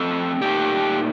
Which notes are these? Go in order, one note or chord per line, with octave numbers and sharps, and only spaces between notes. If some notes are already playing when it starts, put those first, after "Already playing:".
Already playing: F3 A3 C4 A4 A5
A#2 A3 D#4 G4 G5